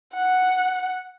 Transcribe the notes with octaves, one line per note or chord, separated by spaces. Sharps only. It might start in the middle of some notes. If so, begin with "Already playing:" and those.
F#5